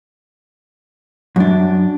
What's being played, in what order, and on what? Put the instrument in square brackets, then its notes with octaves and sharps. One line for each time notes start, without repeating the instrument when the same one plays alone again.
[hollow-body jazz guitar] F#2 D4